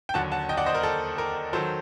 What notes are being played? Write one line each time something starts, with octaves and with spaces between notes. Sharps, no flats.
G5
D#2 D3 F#3 F#5 A5
F#5 A5
D#5 G5
D5 F#5
C5 D#5
A#4
A4
A#4
D#3 F#3 A4 C5